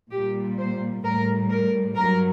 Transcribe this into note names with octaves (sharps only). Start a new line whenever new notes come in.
A#2 G3 G4
C5
A2 G3 A#4
A#4
G2 F#3 A#4